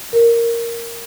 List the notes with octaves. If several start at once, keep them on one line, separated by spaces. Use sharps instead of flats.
A#4